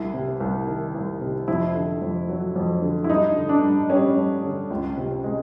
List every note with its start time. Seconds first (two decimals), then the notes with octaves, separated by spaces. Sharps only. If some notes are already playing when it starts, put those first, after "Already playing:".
Already playing: C2 E4
0.14 C3
0.40 C2
0.67 D#3
0.95 C2
1.21 C3
1.48 F2 E4
1.75 D3
2.02 F2
2.29 F#3
2.56 F2
2.82 D3
3.04 E4
3.09 G2 D#4
3.36 D3
3.49 D4
3.63 G2
3.90 G3 C#4
4.16 G2
4.43 D3
4.70 C#2
4.97 C3
5.24 G#3